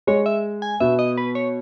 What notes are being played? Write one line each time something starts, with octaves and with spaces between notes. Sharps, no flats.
G#3 C#5
E5
G#5
B2 B3 E5
D#5
B4
C#5